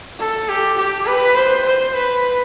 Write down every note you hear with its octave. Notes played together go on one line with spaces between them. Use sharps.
A4
G4
G4
B4
C5
C5
B4